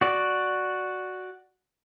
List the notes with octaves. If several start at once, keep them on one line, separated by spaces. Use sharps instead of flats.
F#4 D5